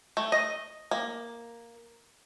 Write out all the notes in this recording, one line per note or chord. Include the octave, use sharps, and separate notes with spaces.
A3
D#5
A#3